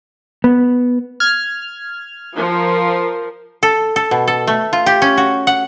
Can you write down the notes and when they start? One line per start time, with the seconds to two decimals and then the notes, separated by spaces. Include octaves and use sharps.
0.44 B3
1.20 F6 G#6
2.34 F3 A#4
3.63 A4
3.96 A4
4.11 B2
4.28 A4
4.47 A3
4.73 F4
4.86 G4
5.02 C#4
5.17 F#4
5.47 F#5